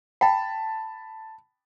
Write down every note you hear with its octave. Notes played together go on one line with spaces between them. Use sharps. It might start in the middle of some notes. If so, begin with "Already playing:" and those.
G5 A5 B5